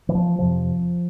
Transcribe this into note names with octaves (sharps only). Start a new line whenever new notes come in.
E3
F3
F2 C3 F3